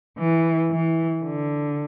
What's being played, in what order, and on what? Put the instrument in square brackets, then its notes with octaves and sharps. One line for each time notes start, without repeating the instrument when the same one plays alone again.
[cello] E3
E3
D3